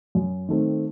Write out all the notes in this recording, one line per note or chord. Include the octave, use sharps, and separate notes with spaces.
F#2
D#3 A3 C4